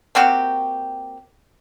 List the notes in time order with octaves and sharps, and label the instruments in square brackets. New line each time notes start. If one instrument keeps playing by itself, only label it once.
[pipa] A#3 C4 F#4 G4